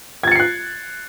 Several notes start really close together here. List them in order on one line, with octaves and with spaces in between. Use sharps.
G#6 A6 C#7 C7 F#6